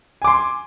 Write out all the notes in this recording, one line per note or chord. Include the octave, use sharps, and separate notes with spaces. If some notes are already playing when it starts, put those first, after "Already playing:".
G#5 C6 D6